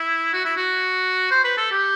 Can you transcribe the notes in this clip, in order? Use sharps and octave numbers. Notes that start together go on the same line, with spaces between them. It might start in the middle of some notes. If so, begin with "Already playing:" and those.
Already playing: E4
F#4
E4
F#4
C5
B4
A4
G4